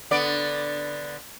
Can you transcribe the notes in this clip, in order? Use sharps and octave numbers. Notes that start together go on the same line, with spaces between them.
D3 B3 D5